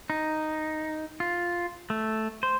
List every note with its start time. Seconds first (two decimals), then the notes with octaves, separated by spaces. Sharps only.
0.10 D#4
1.20 F4
1.90 A3
2.43 C5